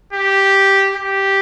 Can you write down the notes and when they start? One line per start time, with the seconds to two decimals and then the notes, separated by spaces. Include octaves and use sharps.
0.13 G4
0.95 G4